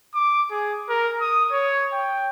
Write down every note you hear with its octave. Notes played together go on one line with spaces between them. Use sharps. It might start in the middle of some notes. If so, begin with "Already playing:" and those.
D6
G#4
A#4
D#6
C#5
G5